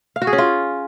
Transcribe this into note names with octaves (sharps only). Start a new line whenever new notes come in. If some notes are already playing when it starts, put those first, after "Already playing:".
F5
F#4
G#4
C#4
F4